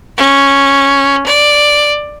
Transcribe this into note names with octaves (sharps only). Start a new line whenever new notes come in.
C#4
D5